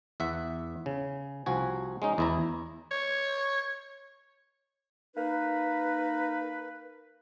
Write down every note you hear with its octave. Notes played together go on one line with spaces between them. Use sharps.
E2 E5 F#5
C#3
C2 F3 F#4 G#5
G#3 C#4 D#4
E2 E4 A#5
C#5
A#3 D#4 B4